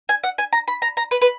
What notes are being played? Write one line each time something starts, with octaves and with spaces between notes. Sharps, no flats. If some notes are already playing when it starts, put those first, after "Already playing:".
G#5
F#5
G#5
A#5
B5
A#5
A#5
B4
B4